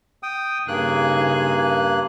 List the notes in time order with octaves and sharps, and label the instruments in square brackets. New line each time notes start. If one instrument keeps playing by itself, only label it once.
[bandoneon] G5 D#6
[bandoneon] G2 A#3 F#6 [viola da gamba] C#3 D#4 G#4